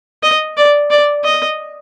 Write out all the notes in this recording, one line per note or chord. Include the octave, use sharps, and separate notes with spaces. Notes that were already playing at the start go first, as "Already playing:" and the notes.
D#5
D5
D5
D#5